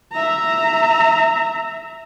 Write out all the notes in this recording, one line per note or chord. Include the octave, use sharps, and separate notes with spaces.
E5 A#5